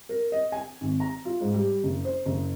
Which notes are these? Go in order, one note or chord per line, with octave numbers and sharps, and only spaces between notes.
A#4
D#5
G#5
G#1
A#5
F4
G#2
G3
F#1
C5
F#1